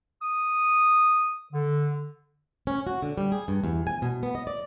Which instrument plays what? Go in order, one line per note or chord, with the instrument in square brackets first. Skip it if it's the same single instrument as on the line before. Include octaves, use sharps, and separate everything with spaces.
[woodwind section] D#6
D3
[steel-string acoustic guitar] C#4
F#4
D3
G3
G#4
G2
E2
G#5
B2
B3
D#5
D5